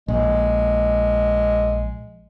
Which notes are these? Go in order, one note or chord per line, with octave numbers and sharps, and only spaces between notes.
A#1 G#3